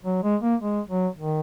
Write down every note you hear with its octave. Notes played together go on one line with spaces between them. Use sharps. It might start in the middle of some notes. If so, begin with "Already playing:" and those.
F#3
G#3
A#3
G#3
F#3
D#3